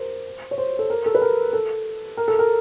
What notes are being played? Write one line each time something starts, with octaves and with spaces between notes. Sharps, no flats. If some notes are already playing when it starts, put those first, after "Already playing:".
Already playing: A#4 C5
C#5
C5
A4
A#4
A4
B4
A#4
A4
A#4
A4
A#4